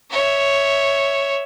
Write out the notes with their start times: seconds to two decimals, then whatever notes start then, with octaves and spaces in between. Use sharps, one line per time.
0.10 C#5 E5